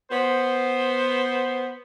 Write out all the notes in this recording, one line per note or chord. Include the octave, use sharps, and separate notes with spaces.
B3 C5